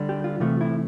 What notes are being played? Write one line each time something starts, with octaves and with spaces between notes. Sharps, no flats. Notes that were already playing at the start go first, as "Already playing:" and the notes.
Already playing: D3 G3
G4
F4
C3 E3 A3 F4
E4